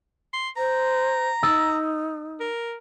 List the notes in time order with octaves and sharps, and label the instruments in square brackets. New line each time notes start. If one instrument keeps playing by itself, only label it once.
[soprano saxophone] C6
[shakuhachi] C5 [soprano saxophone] A#5
[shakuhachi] D#4 [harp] D#6 E6 A6
[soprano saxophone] A#4